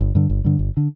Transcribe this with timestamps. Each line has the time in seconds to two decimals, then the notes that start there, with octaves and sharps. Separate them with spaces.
0.01 G1
0.15 G2 D3
0.29 G1
0.44 G2 D3
0.59 G1
0.77 D3